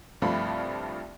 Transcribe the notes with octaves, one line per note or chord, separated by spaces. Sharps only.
C2 G2 F3 A3 F4 B5